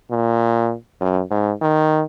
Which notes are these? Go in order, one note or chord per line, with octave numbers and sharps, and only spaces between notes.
A#2
F#2
G#2
D#3